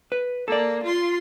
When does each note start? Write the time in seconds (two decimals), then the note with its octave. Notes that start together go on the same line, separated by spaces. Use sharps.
0.12 B4
0.48 A#3 A4 D5
0.83 F4 C6